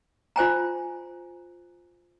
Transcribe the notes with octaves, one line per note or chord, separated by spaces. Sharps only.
F4 C5 G#5 A#5